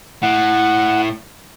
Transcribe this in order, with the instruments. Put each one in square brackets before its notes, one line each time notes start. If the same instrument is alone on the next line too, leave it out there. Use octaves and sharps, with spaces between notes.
[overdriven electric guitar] A2 [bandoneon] F#5